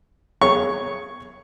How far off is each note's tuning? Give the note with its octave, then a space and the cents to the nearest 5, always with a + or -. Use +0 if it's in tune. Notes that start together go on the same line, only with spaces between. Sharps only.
G#4 +0 C#5 +0 C#6 +0